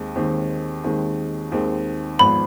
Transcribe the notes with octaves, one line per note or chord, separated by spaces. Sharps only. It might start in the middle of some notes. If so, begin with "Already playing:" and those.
Already playing: D#2 D#3 G#3 C4
D#2 D#3 G#3 C4
D#2 D#3 G#3 C4
D#2 D#3 G#3 C4
G#1 G#2 F3 B3 B5